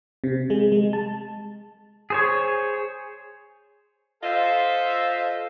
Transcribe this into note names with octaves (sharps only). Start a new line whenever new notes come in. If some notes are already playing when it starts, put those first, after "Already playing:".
C3
G#3
G#3
A5
G#4 C5 C#5
F4 A4 C5 D#5 E5